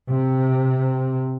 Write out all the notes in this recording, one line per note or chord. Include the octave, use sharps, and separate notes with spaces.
C3